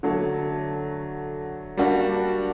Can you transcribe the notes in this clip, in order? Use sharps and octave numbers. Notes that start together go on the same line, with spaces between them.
D3 F#3 A3
G3 A#3 D4 F#4